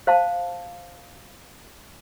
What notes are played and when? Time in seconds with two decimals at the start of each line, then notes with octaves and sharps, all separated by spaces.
0.07 C5 F5 A5